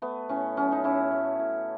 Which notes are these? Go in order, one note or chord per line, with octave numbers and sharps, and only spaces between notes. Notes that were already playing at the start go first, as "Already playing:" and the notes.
A3 B3
A2 C#4
F#3 C#4
D#4
A2 C#4 E4
A3
A2